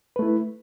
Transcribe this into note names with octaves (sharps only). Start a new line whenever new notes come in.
A3 E4 B4